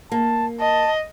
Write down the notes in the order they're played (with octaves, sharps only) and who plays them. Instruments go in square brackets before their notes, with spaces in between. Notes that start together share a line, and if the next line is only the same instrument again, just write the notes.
[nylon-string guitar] A#3 [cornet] A5
[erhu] D#5 [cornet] A5